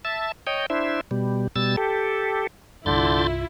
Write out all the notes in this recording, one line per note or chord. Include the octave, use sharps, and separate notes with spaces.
E5 A5
C#5 D#5 G5
D4 E4 C5 E5
B2 G3
B2 G3 E6 A6
G4 A4
C2 G2 D3 E4 F4 C6 G6 A6